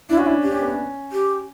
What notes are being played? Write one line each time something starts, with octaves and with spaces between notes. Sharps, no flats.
D4 E4
C#4 F#4
D4 E4
D4 G4
C#4
B3
C#4
G4